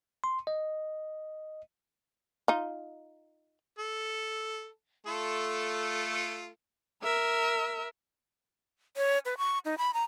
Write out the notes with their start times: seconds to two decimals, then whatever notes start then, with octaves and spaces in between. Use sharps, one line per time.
0.24 C6
0.47 D#5
2.48 D#4 F4
3.79 A4
5.07 A3 F4 A4
7.03 A#4 E5
8.97 C#5
9.26 B4
9.38 C#6
9.65 D#4
9.78 B5
9.94 A#5